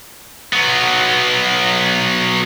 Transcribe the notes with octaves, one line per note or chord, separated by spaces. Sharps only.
F#3 B3